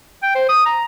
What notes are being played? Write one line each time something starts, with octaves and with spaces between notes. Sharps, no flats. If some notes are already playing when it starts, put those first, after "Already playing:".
G5
C5
D#6
A#5